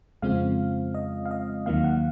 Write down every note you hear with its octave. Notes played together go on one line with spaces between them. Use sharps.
F2 C#3 G#3 C4 F4 F5
D#5
F5
D#5
D#2 D#3 F#3 A#3 F5
F#5